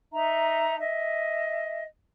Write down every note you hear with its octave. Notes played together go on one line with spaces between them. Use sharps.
D#4 E5 A#5
D#5 E5